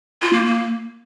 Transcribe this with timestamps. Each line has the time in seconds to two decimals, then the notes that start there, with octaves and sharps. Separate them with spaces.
0.22 F4
0.33 A#3
0.44 A#3